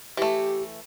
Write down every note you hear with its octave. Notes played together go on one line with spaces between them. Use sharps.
E3 A3 G4